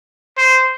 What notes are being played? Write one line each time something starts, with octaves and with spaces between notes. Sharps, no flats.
C5